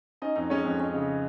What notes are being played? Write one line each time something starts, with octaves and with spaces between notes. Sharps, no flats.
C#4 D#4 D#5
F2 D#4 D#5
G#3 C#4 C#5
F2
C#4
C#3